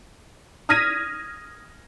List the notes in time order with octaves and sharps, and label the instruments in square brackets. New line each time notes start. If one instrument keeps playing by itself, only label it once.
[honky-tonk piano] D#6 F6 G#6 A#6 B6 D#7